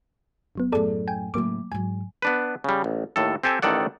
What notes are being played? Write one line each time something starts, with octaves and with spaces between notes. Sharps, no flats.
G1 F#3 B3
F#2 A2 G#4 A4 D5
G5 G#5
A2 C#3 F#3 A#3 D6
G#2 F#3 G#5
B3 D4 B4
C#3 G3
A1
D#2 A2 A4
C4 G4 A4 G#5
A1 A2 D#3 A4 D5 F#5